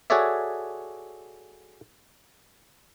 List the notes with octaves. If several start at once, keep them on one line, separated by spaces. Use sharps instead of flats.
F#4 G#4 A4 C#5 D5 E5